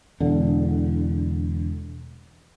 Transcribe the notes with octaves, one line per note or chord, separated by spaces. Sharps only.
E1 D3